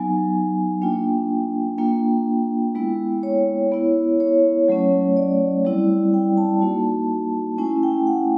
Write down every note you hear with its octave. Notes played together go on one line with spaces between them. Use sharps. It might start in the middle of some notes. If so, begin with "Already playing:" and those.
Already playing: F#3 B3 D#4 G#5
A#3 D4 F4 G5
A#3 D4 F4 G5
G#3 B3 E4
C#5
B3 E4
C#5
F#3 A3 C#4
D5
G3 C4 E4
G5
A5
A#3 D#4 F#4
A3 C#4 E4 G#5
G5
F#5